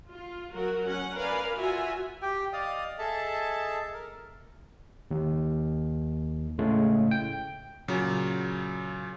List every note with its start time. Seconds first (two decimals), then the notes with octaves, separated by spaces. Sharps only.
0.12 F4
0.54 F#3 F#4 A#4
0.87 C#4 F#5
1.18 A#4 B4 D5 F5 G#5
1.56 F4 F#4 E5 G#5
2.22 G4 G5
2.53 D5 D#5 F5 D#6
2.99 G#4 A4 D#5 E5 A5
3.94 A#4
5.11 D#2
6.58 A2 C#3 G#3 A3
7.11 G5
7.88 A#2 C#3 F#3